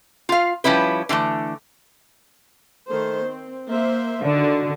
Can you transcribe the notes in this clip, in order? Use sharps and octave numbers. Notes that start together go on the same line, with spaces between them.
F4 F5
F3 G3 C#4 E4 B4
D3 E3 G#3 A3
D#3 A3 C5
C4
A#3 C5 E5
D3 D#3 F#4